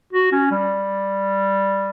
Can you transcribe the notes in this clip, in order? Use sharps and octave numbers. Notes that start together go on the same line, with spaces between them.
F#4
C#4
G3